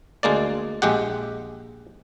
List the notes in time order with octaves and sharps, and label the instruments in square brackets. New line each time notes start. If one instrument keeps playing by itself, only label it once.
[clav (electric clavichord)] D2 G#3 A#3 D5
A#1 G#3 G4 F#5